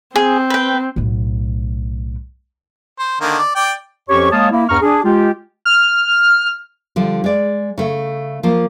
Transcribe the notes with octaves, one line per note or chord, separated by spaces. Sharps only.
C4 G#4
B4 G5
B1 A2
C5
D3 D#3 A#3
D5
D5 G5
F2 F3 C#4 G4 C#5 C#6
G#3 A#3 C#5 F5 A5 D#6
A#3 E4
E2 G2 A#5 C#6 F6
D4 G#4
G#3 F4 G4
F6
D3 F3 G3
G#3 D5
C#3 A3
F3 A#3